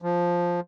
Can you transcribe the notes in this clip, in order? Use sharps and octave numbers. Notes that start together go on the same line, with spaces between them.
F3